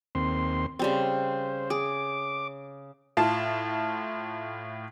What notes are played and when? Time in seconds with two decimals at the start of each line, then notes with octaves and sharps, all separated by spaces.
0.15 D#2 C4 C6
0.79 C#3 G3 C4 C5
1.70 G#4 D6
3.17 A2 F4 A5